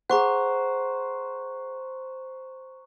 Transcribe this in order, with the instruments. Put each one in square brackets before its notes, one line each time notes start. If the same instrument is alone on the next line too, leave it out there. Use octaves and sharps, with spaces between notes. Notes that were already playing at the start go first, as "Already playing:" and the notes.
[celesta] G#4 F#5 [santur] C5 [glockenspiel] A#5 C#6 F#6